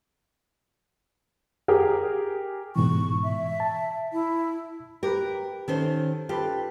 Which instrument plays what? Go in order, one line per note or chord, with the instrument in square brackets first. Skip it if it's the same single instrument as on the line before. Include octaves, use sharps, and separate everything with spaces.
[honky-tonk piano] G4 G#4 A#4
[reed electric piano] G#2 B2 E3 [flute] C#6
[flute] E5
[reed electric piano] A5
[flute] E4
[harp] G4 B4 [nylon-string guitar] A#4
[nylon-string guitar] D#3 C#4 C5 [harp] A4
[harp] F4 A4 B4 [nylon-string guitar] G4